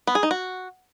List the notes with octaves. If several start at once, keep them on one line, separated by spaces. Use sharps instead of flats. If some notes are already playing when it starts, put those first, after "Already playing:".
B3
G#4
D#4
F#4